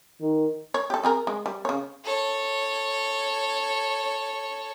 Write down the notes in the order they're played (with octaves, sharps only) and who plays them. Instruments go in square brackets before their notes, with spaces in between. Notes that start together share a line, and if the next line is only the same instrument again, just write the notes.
[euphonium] D#3
[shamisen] C#5
G4 A4
C4 G#4 A#4
G#3
G3
C#3 C#5
[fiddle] A4 C#5